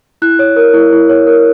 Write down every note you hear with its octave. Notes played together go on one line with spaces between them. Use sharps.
E4 F#6
C#5
A#4
E4
E4
C#5
A#4